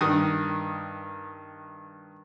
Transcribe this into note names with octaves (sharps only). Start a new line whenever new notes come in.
G2 D#3 D#6